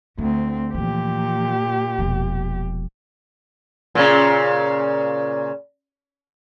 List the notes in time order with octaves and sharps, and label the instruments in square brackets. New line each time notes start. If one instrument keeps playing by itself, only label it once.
[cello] D2 C4 [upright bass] A3
[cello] A#2 G4 [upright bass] E3 F3
[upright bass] E1 F3
[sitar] A#2 C#3